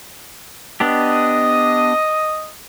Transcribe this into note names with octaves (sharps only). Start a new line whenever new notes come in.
B3 D4 G4 D#5 D#6